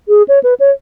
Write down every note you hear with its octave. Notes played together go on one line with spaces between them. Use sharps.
G#4
C#5
B4
C#5